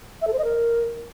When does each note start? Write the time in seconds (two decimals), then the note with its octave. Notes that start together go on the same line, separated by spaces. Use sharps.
0.22 E5
0.27 A4
0.33 C5
0.39 D#5
0.45 A#4